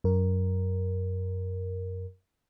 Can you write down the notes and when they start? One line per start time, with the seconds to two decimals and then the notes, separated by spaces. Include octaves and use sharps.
0.04 F#2 A#4